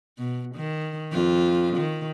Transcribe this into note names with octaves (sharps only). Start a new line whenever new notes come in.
B2
D#3
F2 F4
D#3